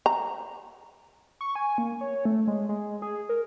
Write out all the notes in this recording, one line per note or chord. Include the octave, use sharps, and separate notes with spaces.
A#5
C#6
G#5
A#3
C#5
A3
G#3
G#3
G#4
A#4